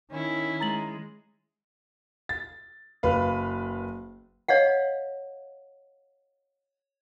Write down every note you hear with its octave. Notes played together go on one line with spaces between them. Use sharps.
D#3 C#4 E4
G#3 A#5 A6 F#7
A6
F#1 B4 F5
C#5 D#5 F5 F#5